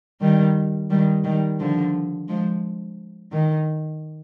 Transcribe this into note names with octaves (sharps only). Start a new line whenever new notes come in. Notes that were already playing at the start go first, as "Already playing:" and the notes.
D#3 G3
D#3 G3
D#3 G3
D3 F3
F3 G#3
D#3